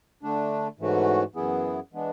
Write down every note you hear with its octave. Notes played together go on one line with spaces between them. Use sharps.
D3 A3 D4
G#2 E3 A3 C#4 F#4
F#2 E3 B3 E4 G#4
E3 G#3 B3 D4